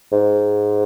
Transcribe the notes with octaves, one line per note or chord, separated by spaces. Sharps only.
G#2